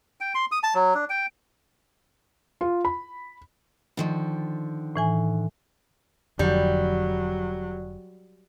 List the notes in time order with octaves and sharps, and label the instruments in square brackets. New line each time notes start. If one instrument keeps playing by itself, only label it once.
[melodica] G5
C6
D#6
A5
F#3
D4
G5
[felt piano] F4
B5
[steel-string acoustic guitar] D3 D#3 F3
[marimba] A2 E3 G#5
[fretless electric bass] F1 F2 D3 [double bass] F#3 [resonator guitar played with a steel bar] G3